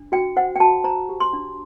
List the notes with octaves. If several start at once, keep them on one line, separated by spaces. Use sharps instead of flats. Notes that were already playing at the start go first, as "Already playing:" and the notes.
Already playing: D4
F#4 G5
C5 F#5
G5
F#4 A5
C5 A#5
G4
C6
D4